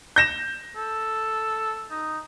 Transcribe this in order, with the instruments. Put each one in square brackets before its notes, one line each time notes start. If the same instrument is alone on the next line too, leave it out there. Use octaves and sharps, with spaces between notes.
[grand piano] G6 A#6 E7
[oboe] A4
D#4